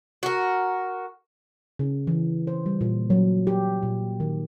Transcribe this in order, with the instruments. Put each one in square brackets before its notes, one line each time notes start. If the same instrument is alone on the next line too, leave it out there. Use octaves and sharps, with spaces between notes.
[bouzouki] F#4 A#4
[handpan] C#3
E3
C5
G3
A#2
F#3
G4
A#2
D#3